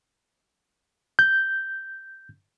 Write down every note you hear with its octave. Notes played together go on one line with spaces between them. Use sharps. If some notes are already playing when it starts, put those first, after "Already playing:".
G6